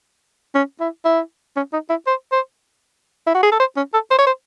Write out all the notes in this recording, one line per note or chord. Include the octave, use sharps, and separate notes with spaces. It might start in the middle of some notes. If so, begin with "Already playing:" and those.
C#4
E4
E4
C#4
D#4
E4
C5
C5
E4
F#4
G#4
A4
C5
C#4
A4
C5
C#5
C5